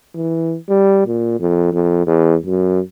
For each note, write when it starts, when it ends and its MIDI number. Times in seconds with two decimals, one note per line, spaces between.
0.15 0.56 52
0.69 1.05 55
1.07 1.39 46
1.40 1.71 41
1.73 2.04 41
2.07 2.35 40
2.46 2.80 42